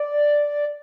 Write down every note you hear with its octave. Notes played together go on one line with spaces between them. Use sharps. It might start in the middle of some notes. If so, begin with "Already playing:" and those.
Already playing: D5